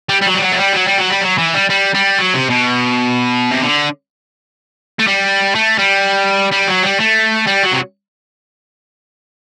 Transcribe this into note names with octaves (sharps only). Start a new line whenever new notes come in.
G3
G3
F#3
G3
F#3
A3
G3
F#3
G3
F#3
G3
F#3
E3
G3
G3
G3
F#3
C3
B2
C3
D3
A3
G3
A3
G3
G3
F#3
G3
A3
G3
F#3
C3